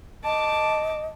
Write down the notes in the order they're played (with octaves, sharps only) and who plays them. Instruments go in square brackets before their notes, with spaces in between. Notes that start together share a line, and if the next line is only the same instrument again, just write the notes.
[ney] D#5 [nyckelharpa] A5 D6